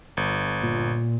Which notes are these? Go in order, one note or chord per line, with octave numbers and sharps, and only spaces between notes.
G1
A#2